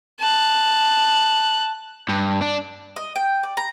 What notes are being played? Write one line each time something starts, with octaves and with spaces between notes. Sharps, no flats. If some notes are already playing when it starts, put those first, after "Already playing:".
A5 F#6
G2
D4
D#5
G5
D5
A#5